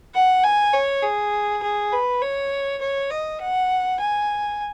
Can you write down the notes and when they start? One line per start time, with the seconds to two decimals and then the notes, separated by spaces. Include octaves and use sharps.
0.15 F#5
0.44 G#5
0.74 C#5
1.03 G#4
1.63 G#4
1.92 B4
2.22 C#5
2.81 C#5
3.11 D#5
3.41 F#5
4.00 G#5